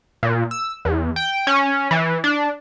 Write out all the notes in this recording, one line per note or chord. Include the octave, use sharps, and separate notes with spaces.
A#2
E6
E2
G5
C#4
E3
D4